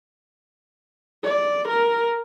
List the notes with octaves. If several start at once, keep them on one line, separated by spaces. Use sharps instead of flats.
D5
A#4